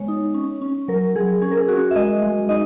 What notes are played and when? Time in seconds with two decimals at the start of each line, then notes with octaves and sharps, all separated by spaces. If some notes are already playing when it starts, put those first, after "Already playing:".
Already playing: G#3 B3 C#5
0.08 D#4
0.34 C#4
0.62 C#4
0.88 F#3 A#4
1.16 F#3 G#4
1.42 C#4 G#4
1.51 A#4
1.61 G#4
1.68 C#4 F#4
1.91 E5
1.95 G#3 D#5
2.22 G#3
2.49 D#4 D#5